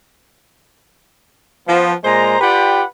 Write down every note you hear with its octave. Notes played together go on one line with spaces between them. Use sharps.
F3 B3
A#2 G#3 C5 A#5
F4 G4 B4 D5 F#5 G5